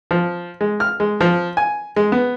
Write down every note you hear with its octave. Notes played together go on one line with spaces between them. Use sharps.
F3
G#3
F6
G#3
F3
G#5
G#3
B3